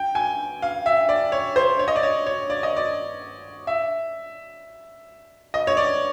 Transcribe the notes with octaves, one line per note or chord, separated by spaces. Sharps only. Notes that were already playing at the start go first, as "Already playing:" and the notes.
Already playing: G5
G#5
F5
E5
D5
C#5
C5
C#5
D#5
D5
C#5
C#5
D5
D#5
D5
E5
D#5
C#5
D5